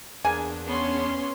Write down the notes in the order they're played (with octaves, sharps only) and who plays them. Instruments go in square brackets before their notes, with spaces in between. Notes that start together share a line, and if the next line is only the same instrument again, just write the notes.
[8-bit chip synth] E2 D4 [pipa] A#3 G#4 G#5
[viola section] B3 C#4 C6